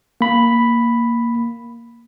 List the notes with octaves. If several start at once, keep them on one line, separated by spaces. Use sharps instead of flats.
A#3 B5